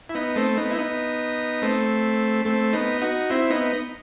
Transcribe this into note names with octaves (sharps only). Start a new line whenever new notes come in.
E4
B3 D#4
A3 C4
B3 D#4
E4
B3 D#4
A3 C4
A3 C4
B3 D#4
D#4 F#4
C4 E4
B3 D#4